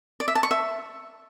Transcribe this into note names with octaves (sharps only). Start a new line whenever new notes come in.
D5
E5
A5
C#6
E5